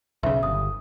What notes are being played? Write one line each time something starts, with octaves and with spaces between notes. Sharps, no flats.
B1 C#3 E5
G1 D#6